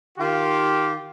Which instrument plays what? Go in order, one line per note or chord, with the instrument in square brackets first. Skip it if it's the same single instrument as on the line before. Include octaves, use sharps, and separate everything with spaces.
[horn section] D#3 F4 G4